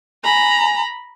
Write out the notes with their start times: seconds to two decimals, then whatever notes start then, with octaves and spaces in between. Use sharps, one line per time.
0.24 G#5 A#5 B5